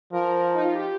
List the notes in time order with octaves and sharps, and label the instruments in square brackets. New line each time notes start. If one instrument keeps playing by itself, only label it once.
[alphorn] F3 [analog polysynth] A#4
[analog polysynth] D#4
F4
G4